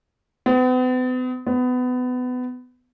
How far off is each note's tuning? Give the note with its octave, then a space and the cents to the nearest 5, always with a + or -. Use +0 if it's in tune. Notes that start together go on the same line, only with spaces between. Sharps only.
B3 +45
B3 +25